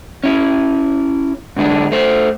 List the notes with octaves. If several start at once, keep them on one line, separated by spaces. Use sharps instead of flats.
C#4 E4
G#2 D3 G#3 D4
A3 C5